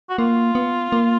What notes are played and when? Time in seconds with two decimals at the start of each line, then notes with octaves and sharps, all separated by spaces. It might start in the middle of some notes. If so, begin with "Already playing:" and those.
0.10 F#4
0.18 A#3 F4
0.55 B3
0.92 A#3